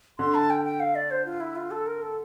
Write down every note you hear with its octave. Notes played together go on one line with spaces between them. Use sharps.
D3 C6
A5
G5
G5
F5
D5
C5
F4
E4
F4
A4
A#4
A4